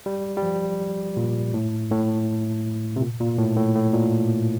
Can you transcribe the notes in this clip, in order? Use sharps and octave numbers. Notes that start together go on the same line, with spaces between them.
G3
G3
F3
A#2
A2
A2
C3
A#2
A#2
A2
A2
A2
A#2